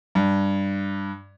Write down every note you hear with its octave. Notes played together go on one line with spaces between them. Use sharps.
G2